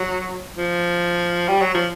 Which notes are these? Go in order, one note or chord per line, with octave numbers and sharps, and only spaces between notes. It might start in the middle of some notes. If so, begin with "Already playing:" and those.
Already playing: F#3
F3
G3
F#3
F3